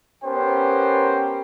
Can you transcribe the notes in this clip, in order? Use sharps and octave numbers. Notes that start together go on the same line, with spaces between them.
B3 C#4 G4 A#4 C5 G5